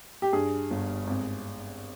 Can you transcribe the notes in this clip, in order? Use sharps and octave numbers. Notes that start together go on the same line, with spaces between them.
G4
G2 G#4
G1
G#1